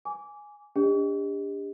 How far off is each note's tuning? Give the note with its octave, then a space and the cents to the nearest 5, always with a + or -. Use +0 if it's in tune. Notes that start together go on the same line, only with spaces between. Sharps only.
G#5 +0 D6 -20
D4 -30 G4 +35 D#5 +0